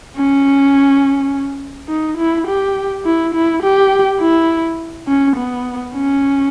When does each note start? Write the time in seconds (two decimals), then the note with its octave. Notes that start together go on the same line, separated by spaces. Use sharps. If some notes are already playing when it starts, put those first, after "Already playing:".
0.17 C#4
1.89 D#4
2.18 E4
2.48 G4
3.06 E4
3.34 E4
3.63 G4
4.20 E4
5.08 C#4
5.37 B3
5.94 C#4